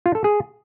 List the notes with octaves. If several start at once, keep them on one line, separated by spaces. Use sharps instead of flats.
F4
A4
G#4